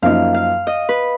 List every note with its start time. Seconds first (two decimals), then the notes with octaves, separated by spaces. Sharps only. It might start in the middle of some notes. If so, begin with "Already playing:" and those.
0.02 F#2 F3 A#3 D#4 F5
0.34 F5
0.67 D#5
0.89 B4